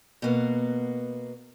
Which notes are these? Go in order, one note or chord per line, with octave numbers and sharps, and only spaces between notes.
B2 A#3 B3